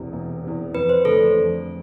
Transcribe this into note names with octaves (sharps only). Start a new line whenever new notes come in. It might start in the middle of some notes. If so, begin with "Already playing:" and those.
Already playing: E1 E2 C3
E1
E2 C3
F2 B4
C5
D3 A3 A4
F2